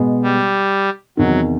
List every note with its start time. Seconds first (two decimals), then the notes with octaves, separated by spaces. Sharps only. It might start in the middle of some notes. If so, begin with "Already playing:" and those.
Already playing: B2 G#3 B3
0.23 G3
1.17 E2 C3 D#3 F#3